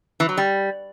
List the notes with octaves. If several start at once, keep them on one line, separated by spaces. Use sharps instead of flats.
E3
F#3
G3